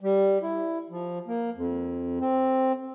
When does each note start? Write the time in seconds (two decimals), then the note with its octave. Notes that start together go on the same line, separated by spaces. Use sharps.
0.01 G3
0.42 E4
0.90 F3
1.27 A#3
1.57 F2
2.21 C4